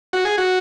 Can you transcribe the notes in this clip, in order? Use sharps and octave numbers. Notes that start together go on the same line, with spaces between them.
F#4
G#4
F#4